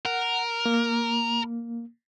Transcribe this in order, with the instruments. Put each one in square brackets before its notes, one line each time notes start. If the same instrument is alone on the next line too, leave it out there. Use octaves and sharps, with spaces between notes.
[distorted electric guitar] A#4 [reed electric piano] F#5
[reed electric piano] A#3